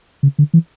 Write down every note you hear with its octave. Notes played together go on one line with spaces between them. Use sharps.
C#3
D3
E3